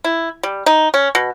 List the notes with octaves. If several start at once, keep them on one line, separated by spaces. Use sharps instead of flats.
E4
G3
D#4
C#4
B2